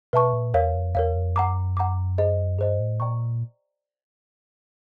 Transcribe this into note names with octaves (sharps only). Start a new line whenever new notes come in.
B2 B4 E5 A5 C#6
A#2
E2 A#4 C#5 F5
F2
E2 A#4 C#5 F5
F2
F#2 F#5 A#5 D6
F#5 A#5 D6
G#4 C5 D#5
G2 G#4 C5 D#5
A2
A#2 D5 G5 A#5 C#6